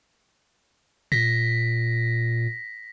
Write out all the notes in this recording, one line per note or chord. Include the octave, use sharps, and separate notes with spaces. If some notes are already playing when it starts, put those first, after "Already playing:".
A#2 A#6 B6